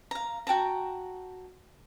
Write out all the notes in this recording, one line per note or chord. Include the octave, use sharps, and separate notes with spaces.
F5 A#5
F#4 G5 A5 A#5